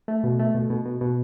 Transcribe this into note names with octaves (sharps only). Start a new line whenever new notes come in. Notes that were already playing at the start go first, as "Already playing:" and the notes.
A3
B2
A3
B2
B2
B2
B2